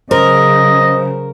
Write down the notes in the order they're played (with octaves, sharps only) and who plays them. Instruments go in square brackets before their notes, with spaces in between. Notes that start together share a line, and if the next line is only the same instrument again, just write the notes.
[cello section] C#3 F#3 [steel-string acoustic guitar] A#4 [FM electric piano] C5 [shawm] D#5